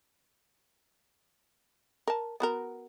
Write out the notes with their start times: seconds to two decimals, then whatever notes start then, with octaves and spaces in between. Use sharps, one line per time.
2.07 A#4 A5
2.40 B3 F#4 A#4